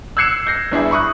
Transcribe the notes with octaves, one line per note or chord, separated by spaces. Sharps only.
E6 F#6 G#6 C7 C#7 E7
G6 A#6 C7
G1 D4 E4 G#4
B5 C#6 D#6 F#6